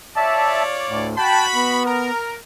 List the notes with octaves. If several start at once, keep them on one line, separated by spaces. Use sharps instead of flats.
F4 C#5 D5 E5 A5
D2 A2
F#4 G5 A5 B5
B3
A#4